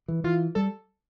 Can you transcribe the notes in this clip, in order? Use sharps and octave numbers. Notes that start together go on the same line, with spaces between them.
E3
E3 F4
G3 A4